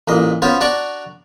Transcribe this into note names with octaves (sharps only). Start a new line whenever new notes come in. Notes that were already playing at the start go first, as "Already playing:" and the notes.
A1 A#2 D#5
B3 C#4 F4 F#4 C5 C#5
D4 F#4 D5 A#5 C#6